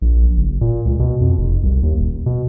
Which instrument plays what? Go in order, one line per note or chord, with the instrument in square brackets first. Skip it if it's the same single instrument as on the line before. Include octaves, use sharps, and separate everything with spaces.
[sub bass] A#1
F#1
A#2
C#2
B2
F2
F1
C2
D#2
D#1
B2